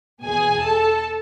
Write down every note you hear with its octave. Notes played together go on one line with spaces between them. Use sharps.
E2 B2 G#4 G#5
A4 A5